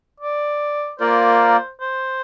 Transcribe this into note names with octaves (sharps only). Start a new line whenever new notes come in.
D5
A#3 F4 A#4 C5 D5
C5